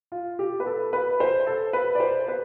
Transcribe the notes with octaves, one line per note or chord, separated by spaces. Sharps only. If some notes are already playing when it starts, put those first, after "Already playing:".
F4
G4
B4
A4
B4
C5
A4
B4
D5
C5
B4